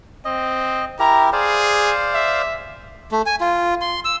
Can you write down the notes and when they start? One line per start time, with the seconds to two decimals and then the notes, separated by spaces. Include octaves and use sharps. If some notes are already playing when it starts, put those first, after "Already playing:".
0.25 C4 D#5
0.99 E4 G4 A#4 A#5
1.33 G#4 C5 D5 F5
2.14 E5
3.12 A3
3.26 G#5
3.41 F4
3.81 C6
4.05 E6